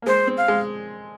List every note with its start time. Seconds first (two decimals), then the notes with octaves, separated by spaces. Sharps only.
0.02 A#3
0.06 G#3 C5
0.27 C4
0.38 F5
0.48 G#3